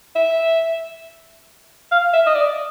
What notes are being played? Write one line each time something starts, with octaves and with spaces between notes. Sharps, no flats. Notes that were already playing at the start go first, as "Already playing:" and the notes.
E5
F5
E5
D#5
D5